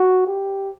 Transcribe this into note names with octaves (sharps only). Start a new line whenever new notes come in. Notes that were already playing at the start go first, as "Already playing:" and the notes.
Already playing: F#4
G4